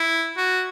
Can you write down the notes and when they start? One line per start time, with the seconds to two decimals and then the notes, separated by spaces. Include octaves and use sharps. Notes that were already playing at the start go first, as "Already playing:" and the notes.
Already playing: E4
0.37 F#4